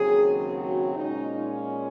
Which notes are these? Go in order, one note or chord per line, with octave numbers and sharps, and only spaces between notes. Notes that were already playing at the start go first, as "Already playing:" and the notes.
Already playing: D#2 C#3 F#3 C4 G#4
F#4
A#2 G#3 C#4 D#4
F4